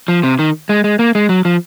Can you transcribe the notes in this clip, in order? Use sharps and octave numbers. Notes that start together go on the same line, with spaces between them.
F3
C3
D#3
G#3
G#3
A#3
G#3
F#3
F3